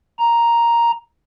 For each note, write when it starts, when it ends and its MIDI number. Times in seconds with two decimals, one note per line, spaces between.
0.19 0.91 82